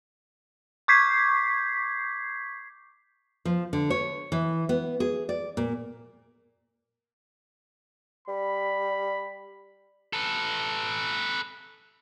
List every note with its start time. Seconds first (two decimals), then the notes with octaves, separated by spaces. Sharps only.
0.88 C#6 D6 G6 G#6 B6 C7
3.45 F3
3.73 D3
3.90 C#5
4.32 E3
4.69 B3
5.00 G#4
5.29 D5
5.57 A#2
8.28 G3 B5
10.13 A4 B4